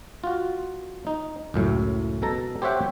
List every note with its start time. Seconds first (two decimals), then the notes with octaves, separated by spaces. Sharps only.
0.24 F4 F#4
1.07 D#4
1.54 C#2 F#2 A2
2.22 B2 A4 A#5
2.62 G4 C5 C#5 E5 F#5 G5